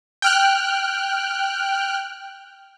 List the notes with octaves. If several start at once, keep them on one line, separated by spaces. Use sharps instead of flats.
G5 F6 F#6